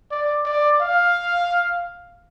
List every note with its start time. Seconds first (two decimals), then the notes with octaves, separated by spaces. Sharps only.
0.11 D5
0.46 D5
0.81 F5